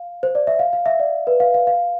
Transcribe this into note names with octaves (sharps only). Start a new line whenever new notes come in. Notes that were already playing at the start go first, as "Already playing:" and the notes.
Already playing: F5
C5
D5
E5
F5
F5
E5
D5
B4
F5
F5
F5